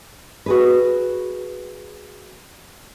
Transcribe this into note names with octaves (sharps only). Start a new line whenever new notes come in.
F#4 G#4 B4